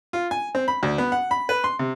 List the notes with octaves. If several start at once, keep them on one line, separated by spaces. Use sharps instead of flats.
F4
G#5
C4
B5
D2
B3
F#5
B5
B4
C6
C3